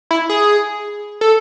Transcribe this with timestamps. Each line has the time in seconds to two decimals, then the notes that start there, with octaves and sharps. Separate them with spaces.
0.11 E4
0.29 G#4
1.21 A4